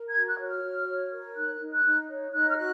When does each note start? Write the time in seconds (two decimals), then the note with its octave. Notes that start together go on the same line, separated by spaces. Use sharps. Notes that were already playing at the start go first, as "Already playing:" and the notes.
Already playing: A#4
0.09 G#6
0.16 F#4
0.27 F#6
0.40 C#5
0.45 F6
0.63 F#4
0.88 C#5
1.12 A#4
1.36 D#4 F#6
1.60 D#4
1.72 F#6
1.85 D#4
2.09 C#5
2.32 D#4 F#6
2.49 F6
2.57 F#4 F#6